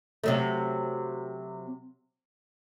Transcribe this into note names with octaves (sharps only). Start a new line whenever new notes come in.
C3 F#3 A3